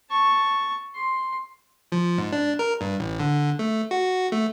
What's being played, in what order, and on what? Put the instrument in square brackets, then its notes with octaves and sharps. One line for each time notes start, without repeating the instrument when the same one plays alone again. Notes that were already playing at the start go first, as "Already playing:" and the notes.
[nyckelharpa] A5 C#6
C6
[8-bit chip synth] F3
G#2
D4
A#4
G2
A1
D3
A3
F#4
A3